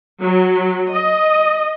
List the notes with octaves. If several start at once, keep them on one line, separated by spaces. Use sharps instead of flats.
F#3
D#5